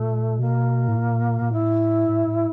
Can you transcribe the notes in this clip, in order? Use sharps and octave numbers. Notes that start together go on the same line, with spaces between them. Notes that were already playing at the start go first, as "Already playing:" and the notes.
Already playing: A#2 A3
B2 A#3
A2
A#2
A#2
A2 E4
A2
A2